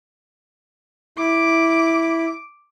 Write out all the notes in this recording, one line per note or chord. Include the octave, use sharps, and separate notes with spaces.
E4 D6